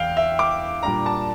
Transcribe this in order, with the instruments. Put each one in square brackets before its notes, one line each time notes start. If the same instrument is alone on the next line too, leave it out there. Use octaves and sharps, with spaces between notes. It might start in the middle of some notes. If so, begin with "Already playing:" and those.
Already playing: [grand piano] E2 F5 G5
E5
D6
A#2 G3 D4 A#5
A5